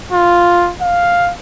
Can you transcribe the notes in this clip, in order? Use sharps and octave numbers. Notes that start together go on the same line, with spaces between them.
F4
F5